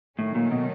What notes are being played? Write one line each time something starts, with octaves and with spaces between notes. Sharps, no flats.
A2 D#3 F#3 A3 C#4
A#2
B2